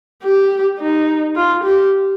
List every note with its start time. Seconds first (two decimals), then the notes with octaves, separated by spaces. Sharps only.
0.23 G4
0.79 D#4
1.36 F4
1.64 G4